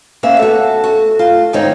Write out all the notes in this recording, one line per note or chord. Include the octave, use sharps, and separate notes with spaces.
A#3 B3 C#4 E5
F#4 A4
F#4
F4
E2 G#2 D#3 C4 D#4 C#5